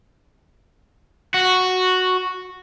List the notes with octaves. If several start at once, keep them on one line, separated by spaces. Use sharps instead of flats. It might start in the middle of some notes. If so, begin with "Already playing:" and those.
F#4